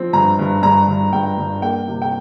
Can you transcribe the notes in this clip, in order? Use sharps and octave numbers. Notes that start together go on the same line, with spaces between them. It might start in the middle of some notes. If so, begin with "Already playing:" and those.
Already playing: F3 C4
G2 A#5
G2
G2 A#5
G2
G2 G5
G2
A#3 G5
C3
G5